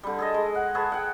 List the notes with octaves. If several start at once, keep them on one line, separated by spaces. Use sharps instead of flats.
D3 G3
G#4 A4 D#5
G#3
F#5
G#4 A4 B4 C#5
F#5 G5